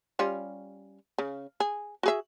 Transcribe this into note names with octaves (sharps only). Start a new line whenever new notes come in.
G3 C#4 F4
C#3
G#4
F#4 G#4 E5